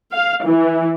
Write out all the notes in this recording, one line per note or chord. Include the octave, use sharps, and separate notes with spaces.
F5
E3